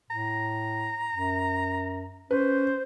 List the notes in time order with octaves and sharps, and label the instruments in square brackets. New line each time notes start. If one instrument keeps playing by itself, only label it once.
[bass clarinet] A2 [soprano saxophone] A#5
[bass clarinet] F#2
[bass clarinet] C#4 [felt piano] B4 [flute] C5